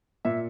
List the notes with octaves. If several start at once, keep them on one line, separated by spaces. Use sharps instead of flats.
A#2 E5